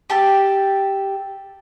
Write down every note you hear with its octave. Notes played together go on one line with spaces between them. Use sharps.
G4 A4 A5